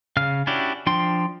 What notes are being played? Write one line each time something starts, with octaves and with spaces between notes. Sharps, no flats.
C#3 F5 F6
C#4 D4 E4 F#4 G4
F3 D4 G5 C6